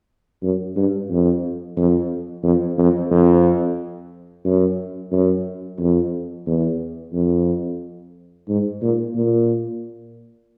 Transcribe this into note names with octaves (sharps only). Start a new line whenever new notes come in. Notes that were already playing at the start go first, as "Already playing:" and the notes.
F#2
G2
F2
F2
F2
F2
F2
F#2
F#2
F2
E2
F2
G#2
A#2
A#2